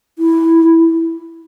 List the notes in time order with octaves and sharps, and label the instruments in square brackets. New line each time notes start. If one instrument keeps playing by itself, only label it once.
[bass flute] E4